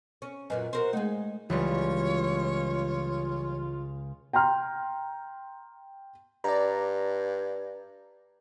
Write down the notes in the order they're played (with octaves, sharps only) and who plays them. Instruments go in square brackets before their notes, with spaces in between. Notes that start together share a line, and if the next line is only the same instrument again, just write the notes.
[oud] C#4
[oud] F#2 A#2 F#3 [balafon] B4 D#5 G#5
[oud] F#4 A#4 C5
[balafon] G#3 A3 [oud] D#4 G#4
[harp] C#2 [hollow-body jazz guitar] E3 F#3 G3 [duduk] F4 [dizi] C#5
[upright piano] G5 A#5 C6 F6
[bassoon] G2 [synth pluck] D5 A#5